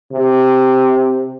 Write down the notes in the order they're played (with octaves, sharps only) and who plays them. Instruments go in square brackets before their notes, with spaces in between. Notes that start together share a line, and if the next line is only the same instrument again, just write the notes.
[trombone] C3